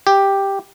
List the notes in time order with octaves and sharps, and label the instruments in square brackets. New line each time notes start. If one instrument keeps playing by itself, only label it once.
[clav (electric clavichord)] G4